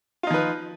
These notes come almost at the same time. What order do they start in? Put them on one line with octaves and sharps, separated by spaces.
F4 D#4 F3 B4